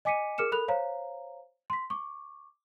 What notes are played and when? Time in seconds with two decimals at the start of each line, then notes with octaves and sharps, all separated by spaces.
0.05 D#5 G#5 D6 B6 C#7 D#7
0.38 G#4 A#4 D6 F6 C#7 E7
0.52 A4 A#4 B5 F#6 F7
0.68 C5 C#5 F5 A#5
1.70 C6 B6
1.90 C#6 D6